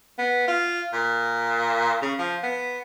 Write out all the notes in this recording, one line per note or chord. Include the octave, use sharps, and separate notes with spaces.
B3
F4
A#2
C#3
F3
B3